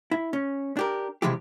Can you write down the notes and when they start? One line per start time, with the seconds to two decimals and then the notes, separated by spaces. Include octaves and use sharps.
0.11 E4
0.33 C#4
0.77 D4 G4 A#4
1.22 C3 E3 F3 G#3 E4 G4